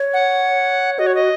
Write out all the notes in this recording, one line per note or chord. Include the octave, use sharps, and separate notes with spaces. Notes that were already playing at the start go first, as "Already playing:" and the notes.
Already playing: C#5
F#5
F#4 D#5
C#5
D#5